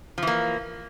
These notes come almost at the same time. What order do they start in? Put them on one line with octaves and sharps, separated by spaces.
F3 E3 A#3